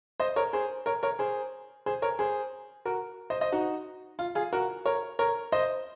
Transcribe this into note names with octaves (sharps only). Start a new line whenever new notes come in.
C5 D#5
A#4 C#5
G#4 C5
A#4 C#5
A#4 C#5
G#4 C5
G#4 C5
A#4 C#5
G#4 C5
F#4 A#4
C5 D#5
C5 D#5
D#4 F#4
F4
F4 G#4
F#4 A#4
A#4 C#5
A#4 C#5
C5 D#5